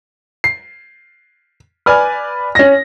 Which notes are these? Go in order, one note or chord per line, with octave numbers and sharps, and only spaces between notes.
C7
B4 D5 G#5 F6
C#4 A#6